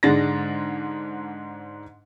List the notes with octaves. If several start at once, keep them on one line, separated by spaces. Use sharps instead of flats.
G#2 D3 G#3 D4 A6 A#6